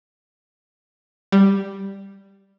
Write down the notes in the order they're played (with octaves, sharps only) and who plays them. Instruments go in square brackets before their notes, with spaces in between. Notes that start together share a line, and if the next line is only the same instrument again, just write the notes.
[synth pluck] G3